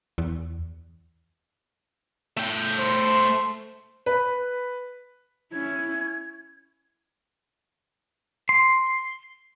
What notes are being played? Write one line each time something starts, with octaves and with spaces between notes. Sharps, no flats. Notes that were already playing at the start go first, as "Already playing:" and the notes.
E2
A3 G5
C5
B4
C#4 E4 G#6
C6